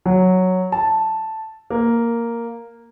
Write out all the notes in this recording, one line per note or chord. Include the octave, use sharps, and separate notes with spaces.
F#3
A5
A#3